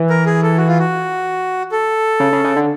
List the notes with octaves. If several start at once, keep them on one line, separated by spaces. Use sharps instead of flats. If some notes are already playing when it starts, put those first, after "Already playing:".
Already playing: E3
A#4
G#4
A4
F#4
F4
F#4
A4
C#3
C#3
C#3
D3